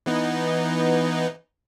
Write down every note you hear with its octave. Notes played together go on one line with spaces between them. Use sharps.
E3 B3 D#4